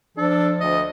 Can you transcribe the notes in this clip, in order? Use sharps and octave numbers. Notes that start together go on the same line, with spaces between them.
F3 D4 A4
D2 D#5